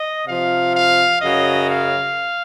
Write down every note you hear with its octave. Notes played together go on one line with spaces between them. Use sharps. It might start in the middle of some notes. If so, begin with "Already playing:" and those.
Already playing: D#5
C3 F3 F5
F5
F#2 C#3 F#3 D#5
F5